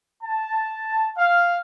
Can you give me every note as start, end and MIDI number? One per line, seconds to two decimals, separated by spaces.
0.22 1.10 81
1.17 1.57 77